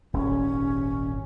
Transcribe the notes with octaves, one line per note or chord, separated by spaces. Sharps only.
D#1 G#1 C#4